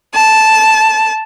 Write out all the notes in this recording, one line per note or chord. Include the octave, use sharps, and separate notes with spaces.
A5